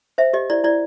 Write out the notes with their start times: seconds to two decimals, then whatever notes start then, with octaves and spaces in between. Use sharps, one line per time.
0.18 C5 E5
0.33 G4 D#5
0.50 E4 D5
0.64 E4 D5